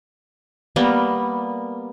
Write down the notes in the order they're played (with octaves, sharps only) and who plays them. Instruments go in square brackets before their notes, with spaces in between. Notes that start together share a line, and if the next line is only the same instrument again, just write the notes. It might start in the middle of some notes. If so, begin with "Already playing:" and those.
[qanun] G3 A#3 B3